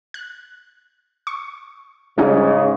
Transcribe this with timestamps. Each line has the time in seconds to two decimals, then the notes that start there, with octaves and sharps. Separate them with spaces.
0.14 F#6
1.27 C#6
2.18 G#2 C#3 G3 C#4 D#4